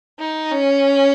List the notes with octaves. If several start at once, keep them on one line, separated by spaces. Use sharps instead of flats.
D#4
C#4